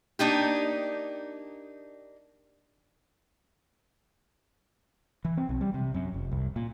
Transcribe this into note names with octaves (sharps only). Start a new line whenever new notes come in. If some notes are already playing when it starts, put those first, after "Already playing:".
A#3 D4 D#4 G4
E3
C4
B1
G3
C3
F#2
F1
C2
A#2